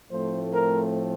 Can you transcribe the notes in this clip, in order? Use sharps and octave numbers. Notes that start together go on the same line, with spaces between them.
A2 F3 A3 C4 C5
A#4